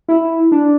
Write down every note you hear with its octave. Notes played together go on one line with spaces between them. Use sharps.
E4
D4